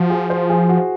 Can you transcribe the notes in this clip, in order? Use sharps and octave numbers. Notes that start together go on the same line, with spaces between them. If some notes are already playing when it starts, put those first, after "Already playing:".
Already playing: F3 F#4
G#4
C5
G#4
F#4